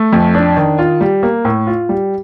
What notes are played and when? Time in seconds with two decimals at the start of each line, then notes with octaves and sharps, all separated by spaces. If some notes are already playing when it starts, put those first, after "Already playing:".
Already playing: A3
0.13 F2
0.35 D4
0.57 D#3
0.79 F4
1.01 G3
1.23 A#3
1.45 A2
1.67 F4
1.89 G3